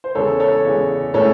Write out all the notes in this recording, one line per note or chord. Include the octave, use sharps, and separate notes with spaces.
C5
E2 C#3 G#3 A4 C#5
A4 C#5
E2 C#3 G#3
A2 G#3 C#4 A4 C#5